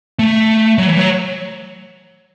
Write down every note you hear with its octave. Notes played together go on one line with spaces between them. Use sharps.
A3
F#3
E3
F#3